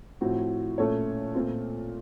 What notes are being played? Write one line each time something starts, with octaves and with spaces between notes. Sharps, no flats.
A2 F3 C4 F#4
A#2 A3 C#4 A4 C#5
A#2 A3 C4 F4